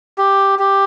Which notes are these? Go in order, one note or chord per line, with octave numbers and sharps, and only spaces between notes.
G4
G4